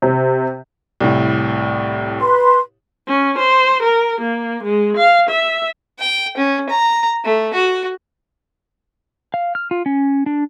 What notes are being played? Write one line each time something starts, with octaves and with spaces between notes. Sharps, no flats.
C3
C2 A2
B4 C6
C#4
C5
A#4
A#3
G#3
F5
E5
G5
C#4
A#5
A3
F#4
F5
F6
F4
C#4
D4